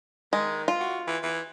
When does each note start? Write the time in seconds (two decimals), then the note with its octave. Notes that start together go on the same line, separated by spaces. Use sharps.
0.33 D#3 G#3
0.68 F4
0.80 F#4
1.07 E3
1.23 E3